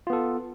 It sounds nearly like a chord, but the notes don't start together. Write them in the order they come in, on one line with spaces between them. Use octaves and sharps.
F4 B3 A4